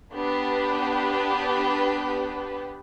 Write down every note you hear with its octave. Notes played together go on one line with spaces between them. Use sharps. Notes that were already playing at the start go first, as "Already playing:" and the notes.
B3 D4 G4 B4